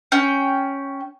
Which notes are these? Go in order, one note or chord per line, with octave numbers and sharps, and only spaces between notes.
C#4 G5